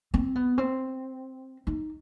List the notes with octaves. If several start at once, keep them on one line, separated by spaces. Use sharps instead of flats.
C4
B3
C4
D#4